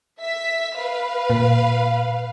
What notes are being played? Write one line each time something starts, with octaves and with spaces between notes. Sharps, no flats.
E5 B6
B4 F5
A#2